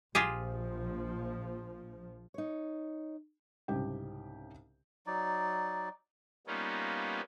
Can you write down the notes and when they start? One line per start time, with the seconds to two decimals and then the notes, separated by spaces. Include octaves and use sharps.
0.15 A#1 F3 F4 G4 G#4
2.34 D#4 C#5
3.68 C2 G#2 C#3 G4 G5
5.07 F#3 D#4 D5
6.47 G3 A#3 B3 C#4 D#4 F4